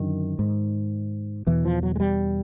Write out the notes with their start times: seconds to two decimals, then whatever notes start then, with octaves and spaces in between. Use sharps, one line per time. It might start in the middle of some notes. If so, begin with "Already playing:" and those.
Already playing: F#2 D3 D#3
0.39 G#2
1.47 E2 B2 E3
1.65 F3
1.83 F#3
1.96 G#3
2.00 G3